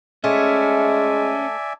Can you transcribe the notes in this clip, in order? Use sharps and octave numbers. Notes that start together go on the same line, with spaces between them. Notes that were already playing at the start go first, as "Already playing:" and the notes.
G#3 A3 C#4 D5 E5 G#5